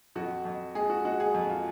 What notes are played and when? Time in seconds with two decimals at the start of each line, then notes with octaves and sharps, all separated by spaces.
0.15 F2 F#4
0.45 F2
0.75 G#3 G#4
0.90 F#4
1.05 G#3 F#4
1.20 G#4
1.34 F2
1.50 F4